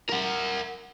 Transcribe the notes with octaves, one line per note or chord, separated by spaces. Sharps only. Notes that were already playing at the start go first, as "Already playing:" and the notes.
A#4 F#5